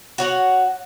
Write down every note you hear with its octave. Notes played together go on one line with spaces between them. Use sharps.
F#4 C#5 F#5